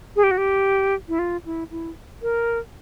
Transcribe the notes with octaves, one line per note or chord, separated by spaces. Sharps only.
G#4
G4
F#4
G4
E4
F4
E4
E4
A#4